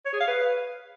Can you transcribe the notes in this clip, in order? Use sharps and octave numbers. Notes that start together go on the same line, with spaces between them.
C#5
G#4
F5
B4